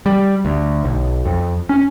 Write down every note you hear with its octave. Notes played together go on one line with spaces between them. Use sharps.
G3
D2
B1
F2
C#4